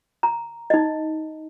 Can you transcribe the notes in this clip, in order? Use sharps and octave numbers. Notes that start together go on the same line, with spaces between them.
A#5
D#4 D#5